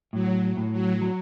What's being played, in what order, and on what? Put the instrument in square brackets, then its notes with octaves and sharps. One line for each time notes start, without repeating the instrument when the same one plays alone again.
[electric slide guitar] A2 [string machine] F#3
[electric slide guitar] A2
[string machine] F#3
[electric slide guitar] F#3